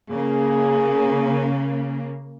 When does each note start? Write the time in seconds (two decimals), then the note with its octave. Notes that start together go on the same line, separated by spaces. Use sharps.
0.10 C#3 A#3 G#4